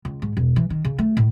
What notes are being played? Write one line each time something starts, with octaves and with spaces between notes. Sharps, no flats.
C#2
G#2
E1
E3
D#3
C#3
A3
A2